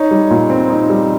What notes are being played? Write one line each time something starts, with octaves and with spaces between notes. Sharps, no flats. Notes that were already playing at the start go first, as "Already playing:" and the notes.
Already playing: D#4 C#5
G3
A#2
C4
D#4
G3